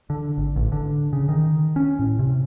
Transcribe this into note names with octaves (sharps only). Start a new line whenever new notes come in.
D3
G#1
A1
D3
C#3
D#3
C#4
A2
C3